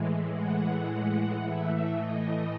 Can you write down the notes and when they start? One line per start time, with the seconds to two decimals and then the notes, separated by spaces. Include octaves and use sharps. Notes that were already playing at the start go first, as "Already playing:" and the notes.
Already playing: A2 E3 G#3
0.33 F#5
1.40 A2 E3 A3 E5
1.95 D#5